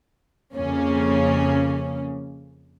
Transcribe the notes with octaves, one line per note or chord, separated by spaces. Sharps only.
F2 C#3 A#3 C#4